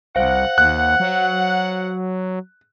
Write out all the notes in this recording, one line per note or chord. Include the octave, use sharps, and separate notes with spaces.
C2 C5 F5 F#5
D#2 F#6
F#3